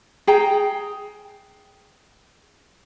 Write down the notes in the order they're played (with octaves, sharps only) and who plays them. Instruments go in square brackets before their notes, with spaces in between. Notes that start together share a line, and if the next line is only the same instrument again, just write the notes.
[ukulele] G#4 G5 A#5